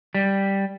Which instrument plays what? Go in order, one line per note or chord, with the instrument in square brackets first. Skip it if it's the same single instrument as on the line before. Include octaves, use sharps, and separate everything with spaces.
[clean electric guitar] G3